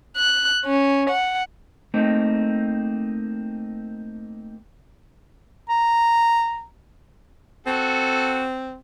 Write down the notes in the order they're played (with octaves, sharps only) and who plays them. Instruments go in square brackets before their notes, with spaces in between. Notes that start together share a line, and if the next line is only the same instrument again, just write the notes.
[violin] F#6
C#4
F#5
[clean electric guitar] A3 A#3 C4 D#4
[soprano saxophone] A#5
[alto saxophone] C4 [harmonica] F#4 A4